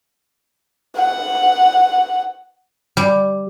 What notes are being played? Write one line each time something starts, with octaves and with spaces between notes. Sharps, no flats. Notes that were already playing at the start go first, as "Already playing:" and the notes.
F#5
G3